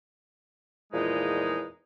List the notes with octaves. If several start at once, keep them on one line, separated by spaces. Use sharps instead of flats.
E2 A#2 E3 F3 G#3 D#4